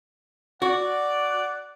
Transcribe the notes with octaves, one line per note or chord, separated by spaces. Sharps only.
F#4 D5 F#5